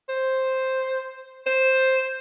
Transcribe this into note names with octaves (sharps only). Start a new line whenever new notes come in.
C5
C5